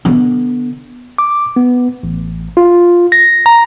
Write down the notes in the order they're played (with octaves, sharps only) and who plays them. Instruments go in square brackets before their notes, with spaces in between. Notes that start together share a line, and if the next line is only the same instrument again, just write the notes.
[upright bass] D3 B3
[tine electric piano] D6
B3
A1
F4
A#6
A#5